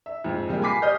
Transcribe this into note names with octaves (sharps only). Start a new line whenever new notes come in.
E5
F2 G#2
C3 F3 G3 G#3 A#3 G4
G#5 B5 D6 B6 C7
G4 C#5 D#5 F6 G6